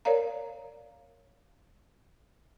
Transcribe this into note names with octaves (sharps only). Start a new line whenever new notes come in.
A#4 C#5 D5 F5 A#5